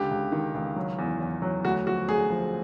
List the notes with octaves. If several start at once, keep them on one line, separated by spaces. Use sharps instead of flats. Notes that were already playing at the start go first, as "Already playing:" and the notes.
Already playing: C#2 D3 G4
C#2
D#3
C#2
F#3
E2
E2
F#3
D2 F#4
F3 F#4
D2 G#4
F3